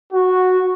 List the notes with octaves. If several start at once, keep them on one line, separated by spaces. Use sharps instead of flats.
F#4